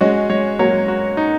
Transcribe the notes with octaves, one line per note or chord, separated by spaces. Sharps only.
G#3 C#4 F#4
G#3 C#5
F#3 A#3 C#5
F#4
D#4